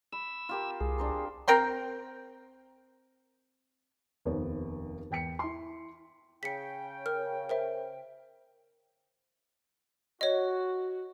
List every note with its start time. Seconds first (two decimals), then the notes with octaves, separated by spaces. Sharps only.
0.12 B5 E6
0.49 F4 G4 A#4
0.81 C2 G#4
0.98 D4 C5 A#5
1.48 C4 A#4 G5 C6
4.25 F1 D#2 B3 C5
5.11 E2 G5 B6 C#7
5.39 E4 C6
6.43 C#3 G5 B6 C#7
7.06 A#4 F6
7.49 A#4 C5 E5
10.21 F#4 C#5 D#5